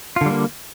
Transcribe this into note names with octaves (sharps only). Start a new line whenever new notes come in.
D3 G3 A#3 F4